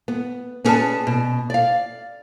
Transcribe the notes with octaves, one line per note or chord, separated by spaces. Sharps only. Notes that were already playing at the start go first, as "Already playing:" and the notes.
B3
B3 C#4 G#4 B4 D5 A5
B2
D5 F5